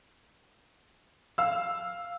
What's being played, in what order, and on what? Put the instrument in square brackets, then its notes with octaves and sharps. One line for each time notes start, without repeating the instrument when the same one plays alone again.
[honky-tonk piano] F5 E6